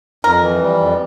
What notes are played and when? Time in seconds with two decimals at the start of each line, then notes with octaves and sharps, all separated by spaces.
0.24 F2 A#4
0.42 E3
0.61 G3
0.80 F2